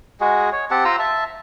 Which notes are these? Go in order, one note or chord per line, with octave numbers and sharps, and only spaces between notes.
G#3 F#4 G#4
C#5
C4 G4 F#5 A5
F4 C5 A#5 E6
E5 A5